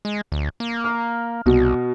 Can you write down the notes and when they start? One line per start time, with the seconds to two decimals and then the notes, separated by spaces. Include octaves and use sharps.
0.05 G#3
0.32 D2
0.60 A#3
0.84 F6
1.46 C2 B2